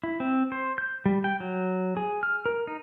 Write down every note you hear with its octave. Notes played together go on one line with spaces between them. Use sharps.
E4
C4
C5
G6
G3
G5
F#3
G#4
F6
A#4
D#4